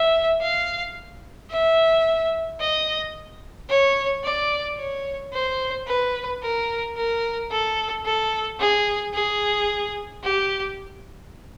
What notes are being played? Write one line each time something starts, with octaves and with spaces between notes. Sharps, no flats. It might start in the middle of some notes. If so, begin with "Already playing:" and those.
Already playing: E5
F5
E5
D#5
C#5
D5
C#5
C5
B4
A#4
A#4
A4
A4
G#4
G#4
G4